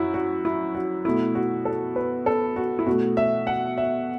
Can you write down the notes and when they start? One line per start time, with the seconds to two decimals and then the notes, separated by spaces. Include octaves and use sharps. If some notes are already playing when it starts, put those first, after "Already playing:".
Already playing: F#2 E4 F#4
0.14 F#4
0.45 E4
0.75 F#4
1.05 B2 A3 E4
1.35 F#4
1.65 A4
1.96 B4
2.26 A4
2.56 F#4
2.79 E4
2.87 B2 A3 F#4
3.17 E5
3.47 F#5
3.78 E5